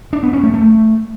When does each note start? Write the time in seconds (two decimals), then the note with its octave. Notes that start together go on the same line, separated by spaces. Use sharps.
0.13 D4
0.23 B3
0.33 C#4
0.43 A3
0.54 A3